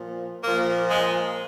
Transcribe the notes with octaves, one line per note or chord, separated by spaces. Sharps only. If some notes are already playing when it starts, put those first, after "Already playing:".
Already playing: A#2 F3
A#2 F3 A#3
G#3